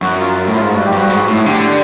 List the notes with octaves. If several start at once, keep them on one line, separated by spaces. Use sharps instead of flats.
F#2 F#4
F4
A2
G#2 F4
G2 F#4
G4
G2
F#4
G#2
A2
D3 G4